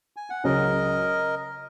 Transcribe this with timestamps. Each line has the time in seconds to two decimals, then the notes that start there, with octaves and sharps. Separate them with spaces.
0.16 G#5
0.30 F#5
0.44 C#2 C#3 F#3 C#4 F#4 A#4 D#5